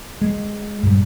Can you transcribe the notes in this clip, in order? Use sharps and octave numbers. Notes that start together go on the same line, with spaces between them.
G#3
G2 A#2 G3